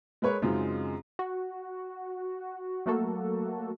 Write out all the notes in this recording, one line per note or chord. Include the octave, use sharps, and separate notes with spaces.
G#3 A#4 B4 C#5
F#2 C#3 G#3 C4 D#4 F4
F#4
F#3 A3 A#3 F#4 A4